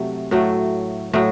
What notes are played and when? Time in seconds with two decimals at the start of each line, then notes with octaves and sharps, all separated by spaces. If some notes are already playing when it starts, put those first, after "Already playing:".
Already playing: C3 F#3 A3
0.31 A2 F#3 A3
1.13 A2 F#3 A3